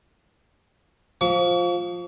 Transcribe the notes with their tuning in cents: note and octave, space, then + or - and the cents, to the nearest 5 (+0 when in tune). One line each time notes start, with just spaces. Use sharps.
F3 +10 C#6 +40